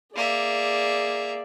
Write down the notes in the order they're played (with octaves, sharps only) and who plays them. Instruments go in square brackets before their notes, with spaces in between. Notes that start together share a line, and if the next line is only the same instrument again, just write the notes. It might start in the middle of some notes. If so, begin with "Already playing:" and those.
[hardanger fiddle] A#3 E5 [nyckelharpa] G#4 D5